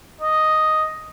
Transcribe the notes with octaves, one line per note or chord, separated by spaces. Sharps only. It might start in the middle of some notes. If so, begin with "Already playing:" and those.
D#5